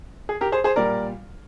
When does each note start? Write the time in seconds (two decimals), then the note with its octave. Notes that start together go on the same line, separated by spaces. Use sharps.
0.29 G#4
0.41 G4 A#4
0.52 G#4 C5
0.64 G#4 C5
0.76 A#2 G3 A#4 D5